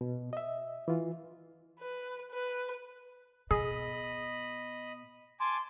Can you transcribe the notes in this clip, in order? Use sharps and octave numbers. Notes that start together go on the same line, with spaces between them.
B2
D#5 E5
E3 F4
B4
B4
B2 G#4 D#5 B5
G#5 A5 C6 D6